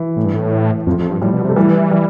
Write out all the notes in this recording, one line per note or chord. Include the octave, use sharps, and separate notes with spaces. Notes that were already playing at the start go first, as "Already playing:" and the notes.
Already playing: E3
A2
G2
A2
F2 F3
F2
G2
A2 G3
B2
C3
A3
E3 G3
G3